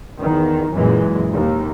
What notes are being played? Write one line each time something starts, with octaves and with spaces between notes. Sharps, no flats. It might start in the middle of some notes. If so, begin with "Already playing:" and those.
E2 D#3
F#2 A#2 E3 G#3
D#2